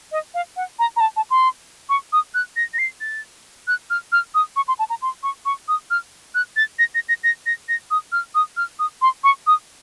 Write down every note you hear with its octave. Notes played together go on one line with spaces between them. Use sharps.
D#5
F5
F#5
A#5
A#5
A5
A5
C6
C#6
D#6
F#6
A#6
A#6
C7
A6
F#6
F6
F6
D#6
C#6
C6
A5
A#5
C6
C#6
C#6
D#6
F6
F#6
A6
A#6
A#6
A#6
A#6
A#6
A#6
D#6
F6
D#6
F6
D#6
C6
C#6
D#6